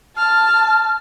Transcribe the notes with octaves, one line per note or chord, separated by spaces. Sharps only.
A5 F6